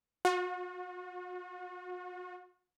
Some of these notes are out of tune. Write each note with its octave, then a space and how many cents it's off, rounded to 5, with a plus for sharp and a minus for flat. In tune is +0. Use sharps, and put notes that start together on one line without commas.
F#4 -40